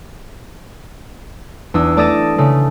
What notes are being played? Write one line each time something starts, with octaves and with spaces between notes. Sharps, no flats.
E2 D4 D#6 E6
A3 D5 D#6 A6 A#6 E7
C#3 A3